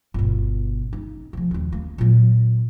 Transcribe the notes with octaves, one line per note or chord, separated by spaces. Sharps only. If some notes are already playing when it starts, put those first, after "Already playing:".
G1 B2
D#4
C3 F3
D#2 C#3
A#3
A#2 F#3